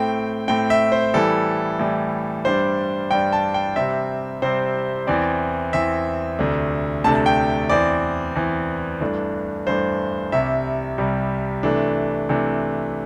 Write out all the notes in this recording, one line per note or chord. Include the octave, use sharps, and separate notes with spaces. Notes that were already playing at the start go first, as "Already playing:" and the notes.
Already playing: A2 A3 C4 G5
A2 A3 C4 G5
E5
C5
A2 E3 G3 A4
A2 E3 G3
G2 G3 D4 C5
G2 G3 D4 G5
A5
G5
C3 G3 C4 E5
C3 G3 C4 C5
E2 E3 C4 D5
E2 E3 C4 E5
D2 C3 A3 D4
D2 C3 A3 D4 A5
A5
G5
E2 E3 C4 D5
E2 E3 C4
G2 E3 A3 D4
G2 E3 A3 D4 C5
C2 C3 G3 E5
C2 C3 G3
C3 E3 A3 D4
C3 E3 A3 D4